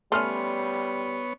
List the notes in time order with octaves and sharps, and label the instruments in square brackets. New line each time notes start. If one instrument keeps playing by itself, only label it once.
[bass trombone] G3 [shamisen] A3 C#4 [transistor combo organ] B3 C#5 [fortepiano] C6 F6